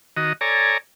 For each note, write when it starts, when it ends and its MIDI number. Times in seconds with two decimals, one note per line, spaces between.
0.17 0.33 51
0.17 0.33 66
0.17 0.33 75
0.41 0.78 69
0.41 0.78 73
0.41 0.78 74
0.41 0.78 80
0.41 0.78 82